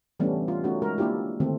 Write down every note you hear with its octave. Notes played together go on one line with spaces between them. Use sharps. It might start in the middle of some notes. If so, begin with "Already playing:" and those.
E3 G3 A3 B3 C#4 D4
F4
A3 C#4 D#4 F#4
G#3 A#4
A#3 D4 E4 F4 G4
D3 D#3 A3 C4 A4